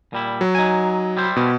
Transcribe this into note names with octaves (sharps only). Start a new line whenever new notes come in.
A#2 G3 E4
F#3
D#4 G#5
G3 E4 C5
B2